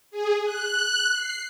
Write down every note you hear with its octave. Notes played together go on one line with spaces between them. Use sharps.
G#4
F#6
C7